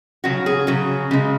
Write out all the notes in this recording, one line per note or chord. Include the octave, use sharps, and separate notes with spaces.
C#3 F#3 F#4
G#4
C#3 F#3
C#3 G#3